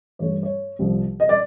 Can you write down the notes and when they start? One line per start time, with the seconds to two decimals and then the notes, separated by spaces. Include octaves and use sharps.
0.19 G2 E3 A3 C#5
0.43 C#5
0.79 C2 C3 F3
1.20 D#5
1.29 D5